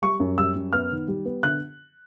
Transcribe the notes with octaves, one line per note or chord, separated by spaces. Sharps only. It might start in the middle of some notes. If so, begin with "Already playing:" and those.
G3 C#6
F#2
G3 E6
F#2
B3 F6
D#3
G3
B3
D3 F#6